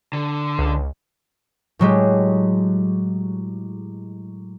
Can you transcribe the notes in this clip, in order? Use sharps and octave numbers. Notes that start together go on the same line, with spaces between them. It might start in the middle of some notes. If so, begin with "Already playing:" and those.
D3
C#2
A2 F#3 G#3 G4